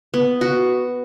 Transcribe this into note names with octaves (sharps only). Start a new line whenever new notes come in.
B3
F#4